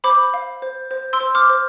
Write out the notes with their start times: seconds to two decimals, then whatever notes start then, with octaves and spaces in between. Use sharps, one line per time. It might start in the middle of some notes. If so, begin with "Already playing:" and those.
0.04 C5 B5 D6
0.34 F5
0.62 C5
0.91 C5
1.13 C6 E6
1.20 C5
1.35 D6 F6
1.49 C5